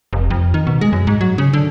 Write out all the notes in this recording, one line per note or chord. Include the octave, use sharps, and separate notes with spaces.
F1
F2
D#3
B2
G#3
F#2
G#2
F#3
C#3
D3